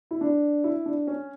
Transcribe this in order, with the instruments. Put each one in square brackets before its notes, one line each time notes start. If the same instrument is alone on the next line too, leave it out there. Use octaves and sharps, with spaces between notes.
[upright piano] E4
D4
E4
D4
C#4